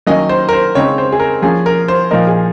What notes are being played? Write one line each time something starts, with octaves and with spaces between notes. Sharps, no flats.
D#3 F#3 A#3 C#4 D#5
C5
A#4
C5
C#3 G#3 C4 D#4 C#5
C5
G#4
A#4
F3 A#3 C#4 G#4
A#4
C5
A#2 F3 A#3 D#4 A#4
G#4